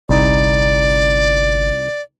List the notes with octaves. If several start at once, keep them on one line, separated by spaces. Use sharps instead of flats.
G1 C2 D#4 D5